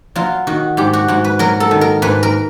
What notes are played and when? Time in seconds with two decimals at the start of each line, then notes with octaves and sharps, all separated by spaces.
0.16 F#3 F4
0.47 D#3 F#4
0.77 G#2 G4
0.93 F#4
1.08 G#2 F#4
1.24 B4
1.39 F#3 A#4
1.60 A4
1.71 D#3
1.81 A#4
2.02 G#2 B4
2.23 A#4